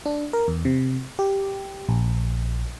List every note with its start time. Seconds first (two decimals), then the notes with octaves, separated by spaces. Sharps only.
0.06 D4
0.33 A#4
0.48 E2
0.65 C3
1.19 G4
1.89 A#1